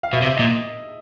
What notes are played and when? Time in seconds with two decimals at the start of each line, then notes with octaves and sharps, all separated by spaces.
0.03 F5
0.13 B2 E5
0.22 C3
0.25 E5
0.37 A#2 D#5